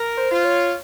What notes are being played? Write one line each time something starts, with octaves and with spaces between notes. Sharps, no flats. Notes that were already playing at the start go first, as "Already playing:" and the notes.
Already playing: A#4
C5
F4 C5
C#5